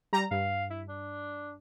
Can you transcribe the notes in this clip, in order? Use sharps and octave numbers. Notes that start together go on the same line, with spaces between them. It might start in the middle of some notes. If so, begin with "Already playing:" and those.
G3 A#5
G2 F5
E4
D4